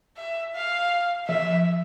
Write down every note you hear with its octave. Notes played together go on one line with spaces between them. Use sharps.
E5
F5
F3 E5